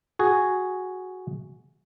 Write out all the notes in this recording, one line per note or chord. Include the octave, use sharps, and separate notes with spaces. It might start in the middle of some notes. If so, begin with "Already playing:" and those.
F#4 G#4